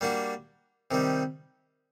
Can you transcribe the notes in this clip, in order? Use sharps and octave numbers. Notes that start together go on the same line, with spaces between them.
G3 A#3 D4 F#4
C3 D#3 G3